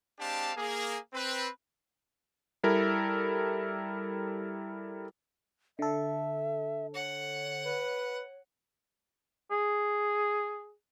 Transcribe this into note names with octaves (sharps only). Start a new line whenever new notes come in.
G#3 C4 D4 G4 F5 A5
A#3 G#4
C4 B4
G3 E4 A4 A#4
D3 A4 E5
C#5 F#5
B4
G#4